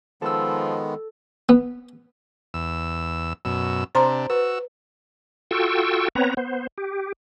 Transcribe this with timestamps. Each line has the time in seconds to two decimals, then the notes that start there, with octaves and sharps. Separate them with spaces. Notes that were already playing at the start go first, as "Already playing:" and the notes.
0.22 D#3 F3 G#3 B3 A4 E6
1.49 B3
2.54 E2 E6
3.45 F#2 B2 E6
3.95 C3 D4 C5 A#5 C6
4.30 F#4 B4 E6
5.51 F4 F#4 A4 G5 C#6 E6
6.15 B3 C4 B4 C#5 A#5
6.37 B3 C5
6.78 G4